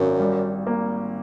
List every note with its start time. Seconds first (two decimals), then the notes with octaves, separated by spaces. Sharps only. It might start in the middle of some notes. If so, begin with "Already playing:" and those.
Already playing: G#1 F#2
0.20 G3
0.67 A#3